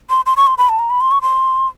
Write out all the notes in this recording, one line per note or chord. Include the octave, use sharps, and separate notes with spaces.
C6
C6
C#6
C6
B5
A5
A#5
B5
C6
C#6
C6